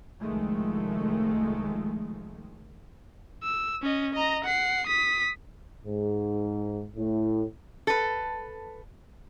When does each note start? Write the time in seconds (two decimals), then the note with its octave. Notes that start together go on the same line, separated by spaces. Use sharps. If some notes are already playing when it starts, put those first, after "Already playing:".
0.21 C2 D#3 F3 G#3 A3
3.43 E6
3.82 C#4 D#5
4.13 D#5 A#5
4.44 F#5 C7
4.87 D#6 B6
5.85 G#2
6.97 A2
7.87 A4 B4